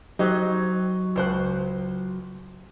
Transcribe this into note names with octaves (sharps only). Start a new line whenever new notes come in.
F#3 D#4 G4 C5
C#2 C5 F#6